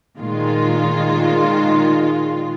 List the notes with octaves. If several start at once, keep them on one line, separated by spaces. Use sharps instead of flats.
A#2 D#3 G#3 F4